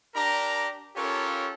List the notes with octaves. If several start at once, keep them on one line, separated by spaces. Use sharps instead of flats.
D4 G4 A#4 A#5
C#4 F4 G4 A4 A#4 C#5